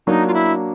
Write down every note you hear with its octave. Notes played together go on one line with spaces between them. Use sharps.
F#3 A#3 D4 D#4
F4
E4